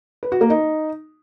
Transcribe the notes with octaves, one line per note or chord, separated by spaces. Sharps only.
B4
F#4
A#3
D#4